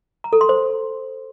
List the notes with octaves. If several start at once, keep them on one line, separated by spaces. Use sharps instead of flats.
A#5
A4
C6
C5